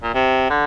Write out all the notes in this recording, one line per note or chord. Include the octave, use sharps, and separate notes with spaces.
A#2
C3
D3